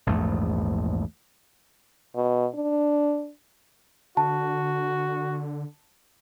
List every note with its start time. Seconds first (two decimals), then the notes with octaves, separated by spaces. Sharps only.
0.07 A#1 E2 G#2 A3
2.16 B2
2.54 D4
4.17 D3 F#4 A5